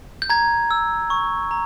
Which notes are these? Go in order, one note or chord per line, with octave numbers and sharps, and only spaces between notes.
G6
A#5 G#6
E6
C#6
A#5